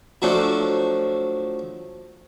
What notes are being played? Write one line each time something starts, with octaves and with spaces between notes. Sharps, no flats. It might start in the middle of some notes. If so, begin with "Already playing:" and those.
F3 F#3 A3 D4